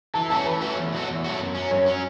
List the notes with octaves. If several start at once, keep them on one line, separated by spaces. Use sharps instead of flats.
E3 A5
A3 C#4 F#4 A5
E3 B4
A3 C#4 F#4
E2
B2 F#3 A3 F#4
E2
B2 F#3 A3 F#4
F#2
F#3 C#4
F#2 C#5
F#3 C#4